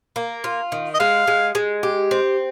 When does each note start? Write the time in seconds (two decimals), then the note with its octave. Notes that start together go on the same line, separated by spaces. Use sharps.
0.16 A#3
0.44 F4
0.72 D#3
0.94 D#5
0.99 G#3 F5
1.27 G#3
1.55 G#3
1.83 G4
2.11 C4